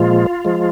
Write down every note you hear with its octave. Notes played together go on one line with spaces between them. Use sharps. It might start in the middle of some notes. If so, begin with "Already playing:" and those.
Already playing: A#2 F3 G#3 F4
F3 G#3